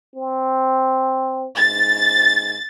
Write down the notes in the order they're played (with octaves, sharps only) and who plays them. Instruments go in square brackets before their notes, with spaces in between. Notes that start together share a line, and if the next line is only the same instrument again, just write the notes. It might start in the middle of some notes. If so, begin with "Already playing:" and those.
[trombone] C4
[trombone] G#2 [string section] A6